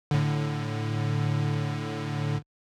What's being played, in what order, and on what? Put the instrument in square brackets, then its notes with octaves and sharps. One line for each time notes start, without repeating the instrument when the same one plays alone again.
[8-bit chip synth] A2 D3